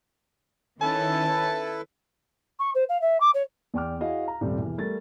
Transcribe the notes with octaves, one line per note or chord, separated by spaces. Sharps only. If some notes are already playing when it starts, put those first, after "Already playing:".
D#3 C#4 E4 A4 B4 A5
C#6
C5
F5
E5
D6
C#5
E2 D5 G5 D6 F6
E4 F#4 G#4 D#5 F5
A#5
D#1 C3 G3 A3 C4 D5
E1 E3
G3 A3 A#4 A6